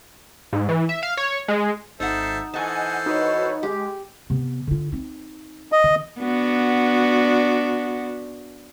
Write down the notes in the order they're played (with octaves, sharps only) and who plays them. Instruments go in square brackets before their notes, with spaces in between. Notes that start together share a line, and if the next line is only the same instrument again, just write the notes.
[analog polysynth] G#2
E3
E5
F5
C#5
G#3
[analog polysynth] G#1 [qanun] D#4 F#5 [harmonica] A4 C5 E5
[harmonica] E3 A4 C5 [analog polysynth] D#5 F#5 G#5 [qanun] A5 C#6
[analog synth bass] D#4 [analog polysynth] F#4 B4 C#5
[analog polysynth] G#3 [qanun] G4
[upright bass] C3 B3
D3 F4
C4 D#4
[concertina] D#5
[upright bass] D#3
[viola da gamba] B3 D4 F#4